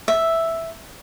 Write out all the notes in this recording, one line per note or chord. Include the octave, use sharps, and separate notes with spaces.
E5